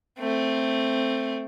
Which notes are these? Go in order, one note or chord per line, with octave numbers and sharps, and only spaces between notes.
A3 C4